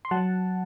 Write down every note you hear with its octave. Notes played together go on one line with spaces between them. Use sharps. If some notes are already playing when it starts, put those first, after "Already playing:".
C6
F#3 F#5 A5